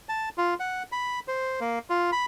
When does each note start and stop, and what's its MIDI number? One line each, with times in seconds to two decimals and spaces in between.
0.09 0.29 81
0.38 0.54 65
0.60 0.83 78
0.92 1.20 83
1.28 1.60 72
1.61 1.79 58
1.90 2.11 65
2.12 2.26 83